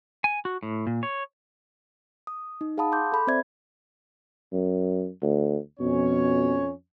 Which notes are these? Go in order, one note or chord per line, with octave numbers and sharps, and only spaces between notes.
G#5
F#4
A2
A#2
C#5
D#6
D#4
G#4 F5 F#5 A5 B5 D#6
C6 D6 G6
A4 B5
C4 C5 D5 E5 B5 G#6
F#2
D2
F2 B2 C#4 C#5